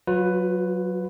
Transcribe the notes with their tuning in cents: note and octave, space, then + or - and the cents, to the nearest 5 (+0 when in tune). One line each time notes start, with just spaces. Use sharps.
F#3 +0 F4 +45 B4 +10